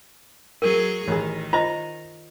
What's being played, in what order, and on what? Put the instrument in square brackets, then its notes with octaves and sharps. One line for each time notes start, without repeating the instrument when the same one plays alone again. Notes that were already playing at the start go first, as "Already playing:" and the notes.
[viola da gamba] F#3 G#4 [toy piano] A#4
[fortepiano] A1 G#4 [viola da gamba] D#3
[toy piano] F4 C5 D#5 [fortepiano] A#5